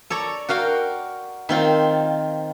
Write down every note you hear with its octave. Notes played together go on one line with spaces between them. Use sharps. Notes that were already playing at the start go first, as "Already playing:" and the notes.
A4 C#5 D5 A#5
F#4 A#4 F5 G5
D#3 C4 F4